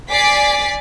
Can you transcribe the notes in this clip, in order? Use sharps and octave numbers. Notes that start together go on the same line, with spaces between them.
D5 G#5 D6 A6 B6 C7